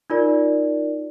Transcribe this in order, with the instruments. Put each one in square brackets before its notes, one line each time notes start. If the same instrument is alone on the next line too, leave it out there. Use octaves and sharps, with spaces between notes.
[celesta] D#4 F4 A#4 D5